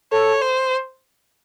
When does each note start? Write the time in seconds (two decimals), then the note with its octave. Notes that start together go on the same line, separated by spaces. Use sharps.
0.12 A4 C#5
0.42 C5